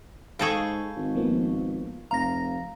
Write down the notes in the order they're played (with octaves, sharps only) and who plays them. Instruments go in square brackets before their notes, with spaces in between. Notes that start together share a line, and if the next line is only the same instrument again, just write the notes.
[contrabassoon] G#2 [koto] G#4 A4 G5 [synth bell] F5 C#6 [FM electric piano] B5
[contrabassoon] G#1
[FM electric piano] F3 A#3 B3
[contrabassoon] F1 [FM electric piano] F5 [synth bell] A#5 A#6